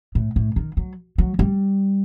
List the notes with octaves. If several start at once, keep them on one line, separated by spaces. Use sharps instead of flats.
A2
A2
D#3
F#3
F#3
G3